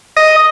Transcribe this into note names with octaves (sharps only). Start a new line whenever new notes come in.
D#5